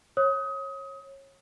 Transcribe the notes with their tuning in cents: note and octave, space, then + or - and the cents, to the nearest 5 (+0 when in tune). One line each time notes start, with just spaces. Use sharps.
C#5 -25 D#6 +25